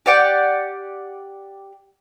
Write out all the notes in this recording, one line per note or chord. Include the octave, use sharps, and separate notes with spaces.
G4 D5 F#5 G5